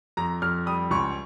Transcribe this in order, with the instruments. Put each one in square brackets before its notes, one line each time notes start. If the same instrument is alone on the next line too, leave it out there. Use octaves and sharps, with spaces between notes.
[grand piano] F2 A#5
F2 F6
G3 D#6
C#2 C#6